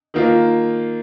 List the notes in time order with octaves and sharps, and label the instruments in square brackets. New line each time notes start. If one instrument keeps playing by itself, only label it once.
[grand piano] D#3 A#3 F4